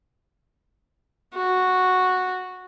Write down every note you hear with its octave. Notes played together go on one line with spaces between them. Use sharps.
F#4